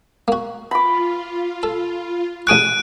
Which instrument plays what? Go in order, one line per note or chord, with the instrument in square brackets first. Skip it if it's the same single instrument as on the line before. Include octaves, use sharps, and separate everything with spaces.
[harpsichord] A#3 F#4
[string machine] F4 [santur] B5 D6
[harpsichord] A4
[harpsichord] A1 G#4 C#6 [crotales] F#6 D7 D#7